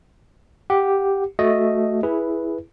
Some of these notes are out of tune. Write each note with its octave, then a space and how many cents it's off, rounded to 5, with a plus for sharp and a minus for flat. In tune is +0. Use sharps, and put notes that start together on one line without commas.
G4 +0 F#5 +0
A3 +0 F#4 +0 D#5 +0
E4 +0 G#4 +0 B4 -10